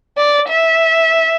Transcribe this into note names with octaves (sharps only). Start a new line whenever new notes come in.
D5
E5